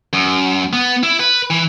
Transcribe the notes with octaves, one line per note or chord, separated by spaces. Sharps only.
F#2
B3
E4
B4
E3